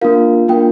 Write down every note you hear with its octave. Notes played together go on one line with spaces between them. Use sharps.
A#3 D4 F4 A#4 F5
A#3 D4 F4 A#4 G5